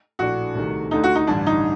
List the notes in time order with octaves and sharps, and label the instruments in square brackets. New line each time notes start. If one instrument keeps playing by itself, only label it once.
[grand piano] A#1 A2 A3 D4 [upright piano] F#4
[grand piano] C2 C3 D#3 A3
[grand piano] D2 D3 A3 [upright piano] D#4
[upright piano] F#4
D#4
[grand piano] A1 G2 D3 [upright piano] D4
[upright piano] D#4